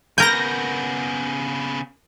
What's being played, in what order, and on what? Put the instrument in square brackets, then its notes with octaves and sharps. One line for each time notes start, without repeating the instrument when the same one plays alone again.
[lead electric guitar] C#3 B3 [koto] A#4 G#5 [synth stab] G6 A#6